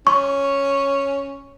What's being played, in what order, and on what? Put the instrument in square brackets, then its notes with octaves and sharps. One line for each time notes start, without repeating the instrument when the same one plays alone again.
[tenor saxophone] C#4 [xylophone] C#6